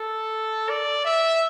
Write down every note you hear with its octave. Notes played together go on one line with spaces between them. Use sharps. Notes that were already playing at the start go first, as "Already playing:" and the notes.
Already playing: A4
D5
E5